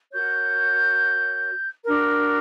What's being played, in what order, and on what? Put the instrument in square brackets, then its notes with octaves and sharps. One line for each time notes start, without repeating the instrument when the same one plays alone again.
[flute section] F#4 A#4 C#5 G6
D4 F#4 A#4